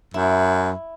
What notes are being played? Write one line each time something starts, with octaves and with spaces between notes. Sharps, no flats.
F#2 E4